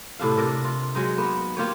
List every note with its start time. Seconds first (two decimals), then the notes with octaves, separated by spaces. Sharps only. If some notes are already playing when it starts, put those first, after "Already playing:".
0.19 A2 C3 D4 F5
0.37 C3 A#4 D5
0.64 F4
0.95 F#3 G#3 D#4
1.18 A#3 B3
1.57 A#3 F4 G4 C#5